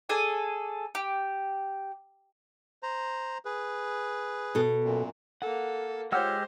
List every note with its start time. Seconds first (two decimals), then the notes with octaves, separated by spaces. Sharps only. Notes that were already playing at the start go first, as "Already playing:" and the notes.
0.09 G#4 A4 D5 G#5
0.95 G4
2.83 C5 A#5
3.45 G#4 B4
4.55 B2 A4
4.84 F#2 A#2
5.42 A#3 A4 F#5
6.12 G#3 F4 G4 C5 C#5 F#5 E6 F6